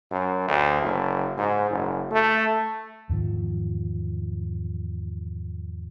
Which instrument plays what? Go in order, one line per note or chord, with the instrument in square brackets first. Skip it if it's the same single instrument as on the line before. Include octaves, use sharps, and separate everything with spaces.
[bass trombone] F#2
D2
F#1
G#2
F#1
A3
[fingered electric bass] E2 G#2 D#3 F3